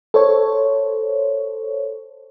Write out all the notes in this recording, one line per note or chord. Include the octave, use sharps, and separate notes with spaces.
A4 C5 C#5